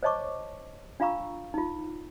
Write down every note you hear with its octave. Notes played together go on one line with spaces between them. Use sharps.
C5 C#5 D#5 A5 C#6 D6
D4 F4 F5 A#5 C#6 E6
D#4 F4